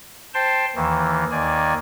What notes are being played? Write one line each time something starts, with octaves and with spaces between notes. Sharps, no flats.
C5 G5 A5 C6
D#2 D#3 E3
D#2 D#3 D5 G#5